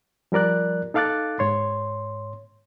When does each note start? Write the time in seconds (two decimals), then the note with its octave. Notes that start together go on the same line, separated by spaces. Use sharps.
0.32 F3 G3 A#4 D5 F#6
0.94 D#4 A4 F5 D6 F#6 A6
1.39 G#2 C#5 C6